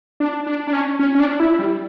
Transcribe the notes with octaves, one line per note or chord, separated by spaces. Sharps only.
D4
D4
D4
C#4
C#4
C#4
D4
E4
G3